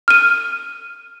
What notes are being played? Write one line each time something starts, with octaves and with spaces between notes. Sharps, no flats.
F6 D#7